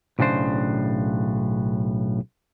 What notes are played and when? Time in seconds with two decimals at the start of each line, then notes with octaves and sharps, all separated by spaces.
0.19 B1 A2 C#3 D4 C5